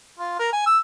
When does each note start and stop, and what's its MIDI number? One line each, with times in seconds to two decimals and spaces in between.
0.19 0.38 65
0.39 0.50 70
0.53 0.62 80
0.66 0.78 88